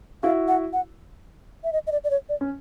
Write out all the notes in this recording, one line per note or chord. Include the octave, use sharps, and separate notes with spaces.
E4 F#4 F5
F#5
F#5
E5
D#5
D#5
D5
D5
C#5
D5
C#4